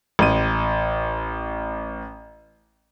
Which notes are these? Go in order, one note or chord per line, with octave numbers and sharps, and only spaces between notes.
A1 D#7